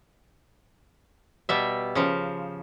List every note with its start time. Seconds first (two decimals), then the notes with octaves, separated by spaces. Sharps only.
1.49 B2 G3 E5
1.95 C#3 F3